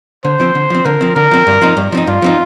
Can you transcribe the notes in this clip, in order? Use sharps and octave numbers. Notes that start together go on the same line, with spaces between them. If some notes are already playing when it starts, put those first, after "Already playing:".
D3 C5
F3 C4
D3
F3 C4
D3 A#4
F3 C4
D3 A#4
F3 C4
G2
F3 C4 D#4
G2
F3 C4 D#4
G2 F4
F3 C4 D#4